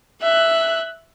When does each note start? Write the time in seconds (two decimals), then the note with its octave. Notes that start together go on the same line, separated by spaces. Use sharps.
0.23 E5 F#6